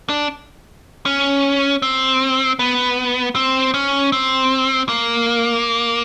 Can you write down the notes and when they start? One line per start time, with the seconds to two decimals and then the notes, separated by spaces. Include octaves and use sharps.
0.09 D4
1.06 C#4
1.82 C4
2.59 B3
3.35 C4
3.74 C#4
4.12 C4
4.89 A#3